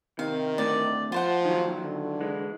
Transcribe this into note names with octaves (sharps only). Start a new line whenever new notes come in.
C3 D#3 F5
D2 A2 D5
F3 F4 C5 F#5
D#3 F#3
D3
E3 G#3